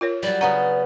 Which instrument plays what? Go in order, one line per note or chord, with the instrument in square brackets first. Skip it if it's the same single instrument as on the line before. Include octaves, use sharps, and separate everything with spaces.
[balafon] F4 A#4 C#5
[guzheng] F#3 G3 [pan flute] D5
[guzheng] C#3 B3 C#4 [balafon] F#5 A#5